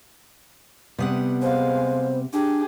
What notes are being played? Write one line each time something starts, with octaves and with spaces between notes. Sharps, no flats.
C3 G3 B3 F#5
G#3 C5 F5
D4 G4 G#4